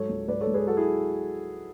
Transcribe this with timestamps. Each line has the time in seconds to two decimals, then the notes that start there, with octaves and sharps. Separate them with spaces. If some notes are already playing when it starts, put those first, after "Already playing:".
Already playing: G#2 F#3 A4 C#5
0.09 C#2
0.28 G#2 B4 D5
0.41 A4 C#5
0.47 G#2
0.54 G#4 B4
0.67 F#3 F#4 A4
0.77 E4 G#4